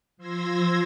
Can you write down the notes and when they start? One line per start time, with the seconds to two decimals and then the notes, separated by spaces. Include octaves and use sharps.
0.17 F3 C6 E6 G#6 A#6